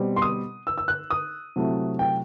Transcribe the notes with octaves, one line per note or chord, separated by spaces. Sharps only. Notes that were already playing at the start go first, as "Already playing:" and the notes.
Already playing: B2 G3 C4
C6
D#6
E6
E6
F#6
D#6
C3 F#3 A3 E4
G5